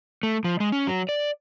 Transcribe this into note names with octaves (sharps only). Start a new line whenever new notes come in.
A3
F3
G#3
C#4
F#3
D5